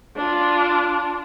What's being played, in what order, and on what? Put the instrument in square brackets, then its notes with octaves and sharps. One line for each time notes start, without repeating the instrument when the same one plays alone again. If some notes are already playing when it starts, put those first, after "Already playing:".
[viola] D4 F4